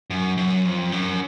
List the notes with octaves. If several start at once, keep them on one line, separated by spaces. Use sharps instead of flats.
F#2
F#2
F2
F#2